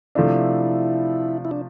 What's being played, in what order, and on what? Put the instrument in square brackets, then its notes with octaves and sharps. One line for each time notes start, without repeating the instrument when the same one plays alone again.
[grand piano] C3 F3 A3 D4 [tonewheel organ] E4
[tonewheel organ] E4
D4